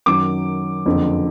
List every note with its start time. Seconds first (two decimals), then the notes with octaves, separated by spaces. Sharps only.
0.06 F#2 D#3 F#3 D6
0.86 F#1 F2 D3